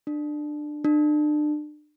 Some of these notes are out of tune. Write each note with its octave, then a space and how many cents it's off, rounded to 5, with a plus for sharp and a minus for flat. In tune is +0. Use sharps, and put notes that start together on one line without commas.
D4 +20
D4 +35